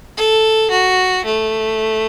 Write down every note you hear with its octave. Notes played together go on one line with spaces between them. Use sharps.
A4
F#4
A3